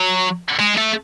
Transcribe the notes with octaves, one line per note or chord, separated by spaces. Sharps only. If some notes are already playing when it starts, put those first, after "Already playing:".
Already playing: F#3
G#3
A3